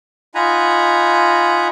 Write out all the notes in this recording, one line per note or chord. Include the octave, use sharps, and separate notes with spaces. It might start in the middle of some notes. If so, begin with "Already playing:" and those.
D#4 F4 F#5 G#5 A#5 B5